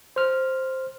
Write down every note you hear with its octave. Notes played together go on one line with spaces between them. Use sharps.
C5 F6